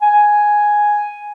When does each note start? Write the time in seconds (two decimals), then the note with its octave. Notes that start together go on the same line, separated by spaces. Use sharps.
0.02 G#5